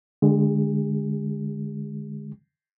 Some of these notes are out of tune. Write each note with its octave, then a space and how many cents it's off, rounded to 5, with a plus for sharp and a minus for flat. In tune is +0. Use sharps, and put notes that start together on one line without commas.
D3 +0 G#3 +0 G#4 -45